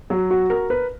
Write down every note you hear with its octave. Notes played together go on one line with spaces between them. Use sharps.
F#3
F#4
A#4
B4